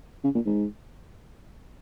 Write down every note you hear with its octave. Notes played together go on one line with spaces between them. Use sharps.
C#3
A#2
G#2